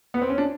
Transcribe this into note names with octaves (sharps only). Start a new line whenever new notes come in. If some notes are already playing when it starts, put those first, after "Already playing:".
B3
C4
C#4
D4